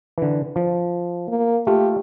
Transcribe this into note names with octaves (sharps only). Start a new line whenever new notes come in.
D3 E3
F3
A#3
A3 F4 G4